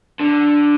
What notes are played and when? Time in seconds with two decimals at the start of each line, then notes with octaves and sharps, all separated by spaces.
0.20 D3